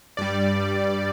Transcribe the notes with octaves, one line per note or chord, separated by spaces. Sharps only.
G2 G3 D5